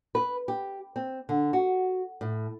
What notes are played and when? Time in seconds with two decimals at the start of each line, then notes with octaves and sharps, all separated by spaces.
0.15 B4
0.48 G4
0.96 C4
1.29 D3
1.53 F#4
2.21 A2